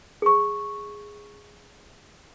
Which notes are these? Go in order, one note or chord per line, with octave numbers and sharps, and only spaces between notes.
G#4 C#6